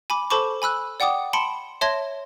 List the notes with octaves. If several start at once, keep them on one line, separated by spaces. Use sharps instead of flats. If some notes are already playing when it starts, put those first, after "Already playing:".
G#5 B5 D6
A4 C5 A5 B5 C#6 D6
G#5 B5 E6 F#6
D5 F#5 G5 D6 D#6
A5 B5 C6 C#7 D7 E7
C#5 E5 A5 C6 G#6 A#6